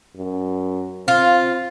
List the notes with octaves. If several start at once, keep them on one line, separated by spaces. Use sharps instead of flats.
F#2
C4 F4